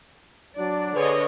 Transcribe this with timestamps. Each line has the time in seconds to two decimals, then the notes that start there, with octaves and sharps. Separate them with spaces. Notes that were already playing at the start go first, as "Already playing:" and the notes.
0.58 F#3 D4 D5
0.96 D3 G#4 B4 C#5 D#5